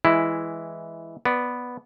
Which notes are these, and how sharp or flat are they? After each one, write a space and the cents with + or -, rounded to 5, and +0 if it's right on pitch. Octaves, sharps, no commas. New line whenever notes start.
E3 -5 G#3 +0 E4 +0
B3 +0 D5 +5